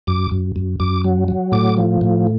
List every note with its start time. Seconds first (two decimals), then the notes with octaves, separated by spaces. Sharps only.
0.07 F#2 D6
0.31 F#2
0.56 F#2
0.80 F#2 D6
1.05 F#3
1.28 F#3
1.52 A2 D6
1.77 F3
2.01 A2